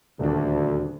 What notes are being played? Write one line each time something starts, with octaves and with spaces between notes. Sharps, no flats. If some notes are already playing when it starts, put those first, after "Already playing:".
D#1 D2 D4